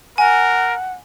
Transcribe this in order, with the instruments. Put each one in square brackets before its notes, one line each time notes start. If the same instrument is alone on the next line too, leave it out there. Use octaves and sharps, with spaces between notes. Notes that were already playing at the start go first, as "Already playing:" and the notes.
[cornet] A#4 [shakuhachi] F#5 [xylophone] G#5